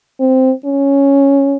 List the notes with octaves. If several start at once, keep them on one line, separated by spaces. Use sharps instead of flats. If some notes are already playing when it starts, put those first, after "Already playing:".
C4
C#4